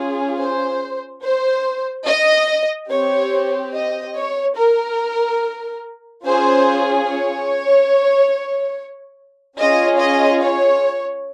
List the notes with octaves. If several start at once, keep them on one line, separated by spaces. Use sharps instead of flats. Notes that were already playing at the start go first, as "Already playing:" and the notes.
Already playing: C#4 F4 G#4
C5
C5
D#5
C4 G4 C#5
D#5
C#5
A#4
C#4 F4 G#4 C5
C#5
C#4 F4 G#4 D#5
D#5
C#5